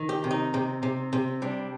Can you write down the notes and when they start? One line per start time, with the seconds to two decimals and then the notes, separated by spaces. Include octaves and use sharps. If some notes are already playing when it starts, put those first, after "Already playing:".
Already playing: D#3
0.09 G4
0.24 C3
0.31 D#4
0.54 C3
0.83 C3
1.13 C3
1.42 G3 D4